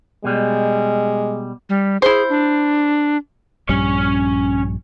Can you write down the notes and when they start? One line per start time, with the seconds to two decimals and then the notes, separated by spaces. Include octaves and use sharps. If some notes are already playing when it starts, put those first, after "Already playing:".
0.24 B2 G3 G#3
1.69 G3
2.02 E4 G#4 C5
2.29 D4
3.69 A#1 G2 G3 C#4 C#5